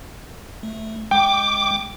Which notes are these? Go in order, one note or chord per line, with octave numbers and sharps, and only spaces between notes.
A3
G#3 G5 D6